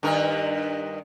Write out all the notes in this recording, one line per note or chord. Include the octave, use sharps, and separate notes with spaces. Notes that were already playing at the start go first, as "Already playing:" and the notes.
G2 D#3 A#4